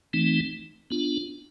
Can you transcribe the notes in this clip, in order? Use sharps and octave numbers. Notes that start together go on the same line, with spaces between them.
E3 A3 C4 D#4
B3 D4 F4